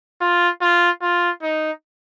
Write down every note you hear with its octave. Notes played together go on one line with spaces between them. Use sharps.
F4
F4
F4
D#4